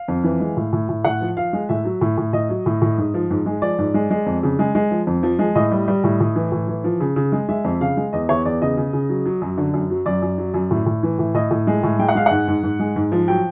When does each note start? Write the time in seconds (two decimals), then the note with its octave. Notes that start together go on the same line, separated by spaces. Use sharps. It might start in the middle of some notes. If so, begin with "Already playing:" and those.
Already playing: F5
0.08 F2
0.24 E3
0.40 G#3
0.57 A2
0.73 A2
0.89 A2
1.05 A2 F#5
1.21 F3
1.37 F3 F5
1.53 G#3
1.69 A2 E5
1.85 F#3
2.01 A2
2.17 A2
2.33 A2 D#5
2.50 F#3
2.66 A2
2.82 A2
2.98 G#2
3.14 F3
3.30 G#2
3.46 G#3
3.62 F3 D5
3.79 G#2
3.94 G#3
4.11 G#3
4.26 F2
4.43 C#3
4.59 G#3
4.75 G#3
4.91 F3
5.07 F2
5.23 F3
5.39 G#3
5.55 A2 D#5
5.71 G3
5.88 G3
6.04 A2
6.20 A2
6.36 E3
6.52 A2
6.68 E3
6.84 F3
7.00 C#3
7.16 C#3
7.32 G#3
7.49 G#3 E5
7.64 F2
7.81 C#3 F5
7.97 G#3
8.13 E2 D#5
8.29 E2 C#5
8.45 E2 D5
8.61 C#3 D#5
8.77 C#3
8.93 C#3
9.09 F#3
9.26 F#3
9.42 F#2
9.57 D3
9.74 F#2
9.90 F#3
10.06 F#2 D5
10.22 F#2
10.38 F#3
10.54 F#2
10.71 A2
10.86 A2
11.03 E3
11.19 A2
11.34 A2 D#5
11.51 A2
11.67 G#3
11.83 A2
11.99 G#3 G5
12.09 F#5
12.15 G#3 F5
12.26 G#2 F#5
12.48 G#2
12.63 G#2
12.79 G#3
12.96 G#2
13.12 F3
13.28 F#3 G5